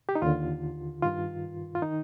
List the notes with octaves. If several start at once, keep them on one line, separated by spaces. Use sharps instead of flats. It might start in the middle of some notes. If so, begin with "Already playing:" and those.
G4
D#4
D#2 D3 F4
G2 D#3 F4
F4
D#3 D#4